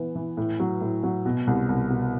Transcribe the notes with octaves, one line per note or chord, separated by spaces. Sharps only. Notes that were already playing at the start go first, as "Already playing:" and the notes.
Already playing: E3 B3
E3
A2
F#3
A2
F#3
B2
C2
C2
B2